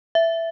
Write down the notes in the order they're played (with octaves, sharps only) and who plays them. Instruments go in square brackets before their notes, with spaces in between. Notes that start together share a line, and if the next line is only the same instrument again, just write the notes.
[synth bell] E5